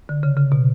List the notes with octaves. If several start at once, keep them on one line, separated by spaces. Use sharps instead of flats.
D3
C#3
C#3
B2